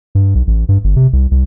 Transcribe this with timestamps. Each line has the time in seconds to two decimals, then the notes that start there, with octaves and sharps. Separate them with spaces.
0.15 G2
0.35 B1
0.47 A1
0.69 G2
0.84 G1
0.96 C3
1.13 C2
1.31 C2